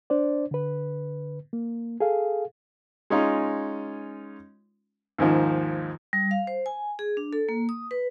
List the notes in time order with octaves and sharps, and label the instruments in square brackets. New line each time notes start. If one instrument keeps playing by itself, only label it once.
[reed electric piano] D4 C5 D5
D3 B4
A#3
G#4 A4 F5
[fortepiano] G#3 C#4 D#4 F4
D#2 G#2 D#3 F3
[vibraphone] G3
F5
C5
G#5
G#4
D4
A4
A#3
D#6
B4